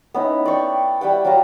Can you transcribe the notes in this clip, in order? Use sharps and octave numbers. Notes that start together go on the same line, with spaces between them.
B3 C#4 D#4 E4
D5 G5 C#6
G3 E5 F#5 G5
F#3 F5 A5 A#5